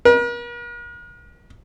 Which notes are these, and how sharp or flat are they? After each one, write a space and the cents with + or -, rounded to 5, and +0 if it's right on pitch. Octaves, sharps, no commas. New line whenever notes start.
A#4 +45